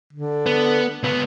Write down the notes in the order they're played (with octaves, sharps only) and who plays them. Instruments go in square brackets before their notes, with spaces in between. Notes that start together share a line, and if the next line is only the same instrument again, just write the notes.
[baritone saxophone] D3
[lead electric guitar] B3
C#2 B3